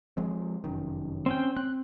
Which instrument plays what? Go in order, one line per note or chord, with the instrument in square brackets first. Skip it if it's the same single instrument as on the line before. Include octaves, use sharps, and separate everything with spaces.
[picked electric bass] F3 G#3 C4
F1 F#2 D#3
[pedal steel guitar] C4 C#4 G5
[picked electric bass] C4 [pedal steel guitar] F#6